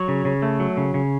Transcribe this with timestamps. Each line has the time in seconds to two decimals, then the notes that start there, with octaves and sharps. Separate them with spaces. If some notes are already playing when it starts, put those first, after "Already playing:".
Already playing: F#3 C#5
0.08 C#3
0.25 C#3
0.42 A3
0.60 F#3
0.77 C#3
0.94 C#3